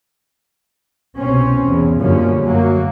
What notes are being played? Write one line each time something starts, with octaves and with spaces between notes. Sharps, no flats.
C2 B2 C4 C#4
E2
F#2 D3 F3 G3 A#3 C#4
F#2 F#3 A#3